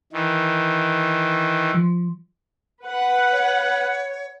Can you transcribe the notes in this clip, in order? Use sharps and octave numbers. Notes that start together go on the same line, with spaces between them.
D#3 E3
F3
B4 F#5
C#5